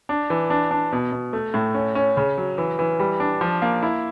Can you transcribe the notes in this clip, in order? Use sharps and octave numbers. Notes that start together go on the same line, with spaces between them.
D4
E3
D4
D4
B2
B2
A3
A2
C#4
C#4
C#3
F#3
E3
E3
G3
D4
F3
A#3
E4